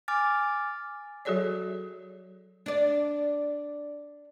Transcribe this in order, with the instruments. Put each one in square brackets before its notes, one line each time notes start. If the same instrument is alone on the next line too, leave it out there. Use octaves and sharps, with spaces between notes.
[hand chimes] G#5 D6 F6 A6
[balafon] F#3 F#4 G#4 A4 C#5 D5
[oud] D4 D5